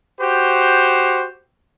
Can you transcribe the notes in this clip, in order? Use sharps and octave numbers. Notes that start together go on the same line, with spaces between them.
F#4 G4 C5